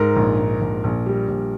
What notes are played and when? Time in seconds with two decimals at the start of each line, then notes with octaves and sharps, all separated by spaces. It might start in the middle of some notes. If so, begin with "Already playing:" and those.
Already playing: G#2 A#4
0.16 A#1
0.39 G#2
0.61 A#1
0.84 A#1
1.06 G3
1.28 A#1